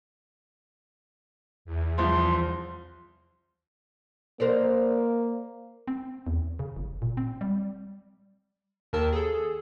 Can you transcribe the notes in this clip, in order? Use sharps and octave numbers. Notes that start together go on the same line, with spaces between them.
E2
C2 F3 C6
A#3 A#4 C5 D5
C4
E2
C#3
G1
A#2
C4
G3
D#2 D#3 A#4 A5 E6
G#4 A4